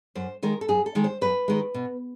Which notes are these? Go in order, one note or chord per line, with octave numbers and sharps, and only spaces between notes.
F#2 C5
D#3 G#3 A#4
A4
F#2 G#4
A4
D#3 G#3
C5
F#2 B4
D#3 G#3
B2